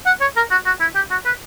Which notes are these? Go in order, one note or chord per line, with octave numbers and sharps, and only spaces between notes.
F#5
C#5
A#4
F#4
F#4
E4
G4
F#4
B4